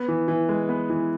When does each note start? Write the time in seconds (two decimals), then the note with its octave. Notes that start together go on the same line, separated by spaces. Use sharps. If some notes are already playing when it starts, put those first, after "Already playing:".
Already playing: B3
0.08 E3
0.28 E3
0.49 G#3
0.69 B3
0.90 E3